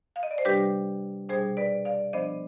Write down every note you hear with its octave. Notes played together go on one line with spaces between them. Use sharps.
F5
D#5
D5
C5
C3 G3 D4 G4 B4
B2 G3 D4 G#4 C5
B4 D5
D5 F5
F3 B3 D4 C5 D#5